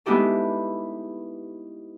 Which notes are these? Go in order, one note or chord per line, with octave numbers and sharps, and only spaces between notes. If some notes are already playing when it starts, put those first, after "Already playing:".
G#3 B3 D#4 E4 G4 A4